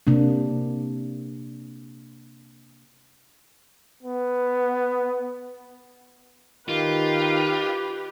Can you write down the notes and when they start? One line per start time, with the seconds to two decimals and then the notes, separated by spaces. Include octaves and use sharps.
0.07 C3 A#3 D4
4.03 B3
6.69 D#3 F4 G4 B4